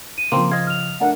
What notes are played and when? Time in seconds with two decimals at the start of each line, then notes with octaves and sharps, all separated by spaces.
0.18 D#7
0.32 C#3 F3 A#3 C4 C6
0.51 D#5 F5 G#6
0.67 F6 F7
1.00 A3 D4 A#4 F#5